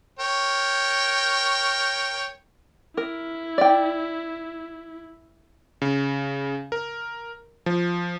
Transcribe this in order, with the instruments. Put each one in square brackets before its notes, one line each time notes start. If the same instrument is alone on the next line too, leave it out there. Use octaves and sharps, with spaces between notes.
[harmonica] A#4 C#5 G5
[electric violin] E4 [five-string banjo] A#4
[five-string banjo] D5 G5
[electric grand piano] C#3
A#4
F3